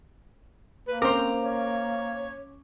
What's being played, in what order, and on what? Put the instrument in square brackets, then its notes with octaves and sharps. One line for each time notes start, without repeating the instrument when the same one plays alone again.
[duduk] A#3 [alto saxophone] B4
[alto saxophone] C4 [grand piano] C#4 D6 [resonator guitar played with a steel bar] A#4 C5
[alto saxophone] C#5